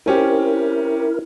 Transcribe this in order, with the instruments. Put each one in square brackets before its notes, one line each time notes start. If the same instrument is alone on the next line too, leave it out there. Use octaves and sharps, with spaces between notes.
[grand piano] C4 C#4 G4 [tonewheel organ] E4 A#4